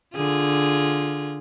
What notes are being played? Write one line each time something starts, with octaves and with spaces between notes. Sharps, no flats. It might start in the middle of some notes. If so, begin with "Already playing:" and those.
D3 F4 G#4